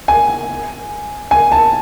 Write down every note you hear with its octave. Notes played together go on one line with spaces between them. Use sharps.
G#5
G#5
A5